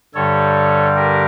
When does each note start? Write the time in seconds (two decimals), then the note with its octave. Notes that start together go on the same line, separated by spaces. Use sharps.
0.14 G2 D3 G3 A4 C#5
0.96 G4 A#4